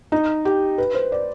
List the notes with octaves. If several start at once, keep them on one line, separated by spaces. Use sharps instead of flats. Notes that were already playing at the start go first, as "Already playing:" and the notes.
D#4
G4
B4
C5
D5